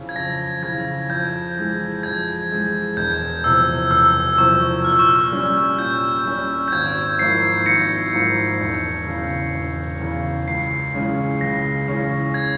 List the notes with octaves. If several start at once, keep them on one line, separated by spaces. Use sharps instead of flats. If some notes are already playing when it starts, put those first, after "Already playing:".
Already playing: F2 C#3 E3
G#6
F2 A#6
C#3 E3 G#6
F2 G6
E3 G#3
F2 G#6
E3 G#3
E1 G6
E2 C3 F3 E6
E1 E6
E2 C3 F3 C#6
A#2 F6
E6
C#6
E6
G3 C#4
A#2 G6
G3 C#4
G6
G#1 G#6
G#2 F3 A#3 E4 C7
G#1 A#6 C#7
G#2 F3 A#3 E4
E1
E2 C#3
E1
E2 C#3
C#2 C7
C#3 E3 G#3 C#4
C#2 A#6
C#3 E3 G#3 C#4
G#6